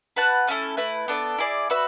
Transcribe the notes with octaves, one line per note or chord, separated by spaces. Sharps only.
F#4 B4 F#5 A5
A3 C#4 E4 A4
A3 E4 B4
B3 D4 A4
E4 G#4 D5
F#4 B4 E5